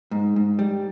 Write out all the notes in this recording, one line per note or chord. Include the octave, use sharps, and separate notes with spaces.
G#2
G#2
G3